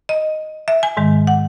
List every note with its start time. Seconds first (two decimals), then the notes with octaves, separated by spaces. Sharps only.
0.09 D#5
0.68 E5
0.83 G#5
0.97 G#2 D#3 G#3
1.27 F#5